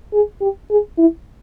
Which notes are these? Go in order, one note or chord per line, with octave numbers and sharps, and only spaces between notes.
G#4
G4
G#4
E4